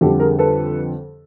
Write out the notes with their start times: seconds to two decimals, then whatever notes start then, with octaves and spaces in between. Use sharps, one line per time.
0.01 F2 D3 G3 G4 A4
0.19 G#4 A#4
0.39 A4 B4